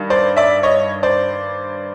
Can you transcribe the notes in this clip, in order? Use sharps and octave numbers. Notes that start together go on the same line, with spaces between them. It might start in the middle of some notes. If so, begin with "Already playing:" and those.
Already playing: G2 D#3
C5 D5
D5 E5
C#5 D#5
C5 D5